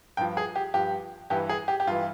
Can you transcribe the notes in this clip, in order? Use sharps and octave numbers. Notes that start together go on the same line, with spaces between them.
G2 F3 G5
G#4
G4
G2 F3 G4
G2 E3 G4
G#4
G4
G4
G2 E3 F4